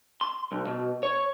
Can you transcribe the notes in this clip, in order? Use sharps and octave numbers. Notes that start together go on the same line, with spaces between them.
C6
B1
B2
C#5